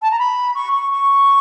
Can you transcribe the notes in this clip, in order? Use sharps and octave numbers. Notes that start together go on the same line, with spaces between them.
A5
A#5
B5
C#6
C#6
C#6